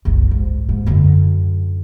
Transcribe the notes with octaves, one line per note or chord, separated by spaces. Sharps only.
F#1 C2
G#2
G#2
F#2 D3